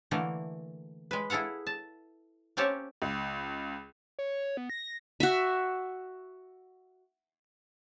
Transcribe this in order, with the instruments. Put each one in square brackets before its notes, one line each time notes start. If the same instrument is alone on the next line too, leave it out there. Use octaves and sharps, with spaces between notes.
[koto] D3 E3 A3 A#3
G#3 B4
E4 G#4 A4 F5 F#5
A5
A#3 C4 C#4 G4 C#5 A5
[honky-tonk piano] C#2
[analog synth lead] C#5
C#5
B3
A#6
A#6
[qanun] F#4 E5